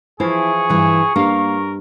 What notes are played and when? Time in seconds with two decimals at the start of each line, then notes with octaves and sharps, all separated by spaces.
0.20 E3 F3 E4 G#4 F5 C#6
0.69 G2 E3 B4
1.16 G2 A#3 A#4 F5